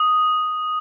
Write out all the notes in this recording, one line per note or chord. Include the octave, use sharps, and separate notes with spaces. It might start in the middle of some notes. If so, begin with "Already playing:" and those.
Already playing: D#6